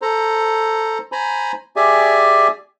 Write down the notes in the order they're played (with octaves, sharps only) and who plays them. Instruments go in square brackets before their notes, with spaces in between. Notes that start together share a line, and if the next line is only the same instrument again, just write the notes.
[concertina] A4 C5 A#5
C5 G#5 A#5 B5
G4 G#4 D5 E5 G#5